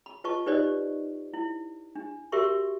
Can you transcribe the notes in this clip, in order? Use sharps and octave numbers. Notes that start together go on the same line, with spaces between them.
B5
F4 B4 D#5 A5 C#6
D#4 G4 B4 C5 D5 D#5
E4
D4
F#4 G4 A#4 E5 C6 C#6